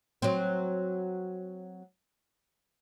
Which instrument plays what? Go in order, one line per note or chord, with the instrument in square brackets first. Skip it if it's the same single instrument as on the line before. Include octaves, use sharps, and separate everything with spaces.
[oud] F#3 C4